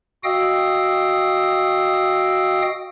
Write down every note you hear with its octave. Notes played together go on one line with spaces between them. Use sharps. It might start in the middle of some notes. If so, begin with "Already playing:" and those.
F#4 D#5 F5 G5 D#6 E6